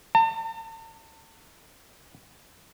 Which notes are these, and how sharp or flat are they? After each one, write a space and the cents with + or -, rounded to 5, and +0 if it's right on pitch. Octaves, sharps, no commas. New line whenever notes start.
A5 +40